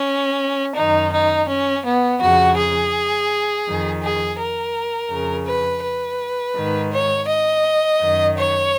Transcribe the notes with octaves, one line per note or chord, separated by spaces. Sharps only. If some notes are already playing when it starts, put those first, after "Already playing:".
Already playing: C#4
F#2 D#3 D#4
D#4
C#4
B3
F2 C#3 F#4
G#4
F2 D#3
G#4
A#4
F2 C#3
B4
B4
G#2 D#3
C#5
D#5
F#2 D#3
C#5